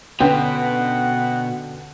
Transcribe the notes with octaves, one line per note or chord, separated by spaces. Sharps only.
B2 D3 B3 C#4 F#5 G5